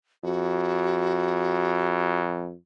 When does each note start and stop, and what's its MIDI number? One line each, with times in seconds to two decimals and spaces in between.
0.24 2.53 41
0.24 2.20 66